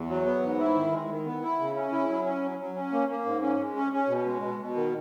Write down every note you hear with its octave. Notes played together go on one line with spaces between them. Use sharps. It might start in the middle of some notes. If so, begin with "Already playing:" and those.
Already playing: E2
F#3
B3
G#2
E4
D#3
G#3
D#3
B3
E4
C#3
C#4
E4
F#3
C#4
F#3
F#3
C#4
A#3
A#3
G#2
C#4
G#3
C#4
C#4
B2
G#3
B2
B2
D#3